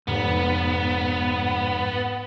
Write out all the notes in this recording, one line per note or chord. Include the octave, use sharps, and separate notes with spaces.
F1 G#2 B3